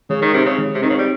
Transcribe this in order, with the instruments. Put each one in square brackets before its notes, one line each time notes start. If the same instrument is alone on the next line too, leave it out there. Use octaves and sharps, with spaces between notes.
[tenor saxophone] C#3 [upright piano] G#3
[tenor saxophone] D#3
[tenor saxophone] C3 [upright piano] C4 D#4
[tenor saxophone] C#3
[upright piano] G#3
[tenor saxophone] C3
[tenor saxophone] D#3 [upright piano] C4 D#4
[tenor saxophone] C#3
G3